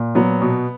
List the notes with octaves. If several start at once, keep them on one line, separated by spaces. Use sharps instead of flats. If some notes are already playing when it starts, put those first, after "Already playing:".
Already playing: A#2
F#3 B3
B2